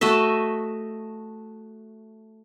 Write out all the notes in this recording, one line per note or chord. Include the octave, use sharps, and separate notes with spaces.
A3 F#4 D#5 E5